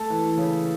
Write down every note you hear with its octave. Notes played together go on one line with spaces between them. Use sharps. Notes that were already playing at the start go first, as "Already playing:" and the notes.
Already playing: A3 A4
E3
C#3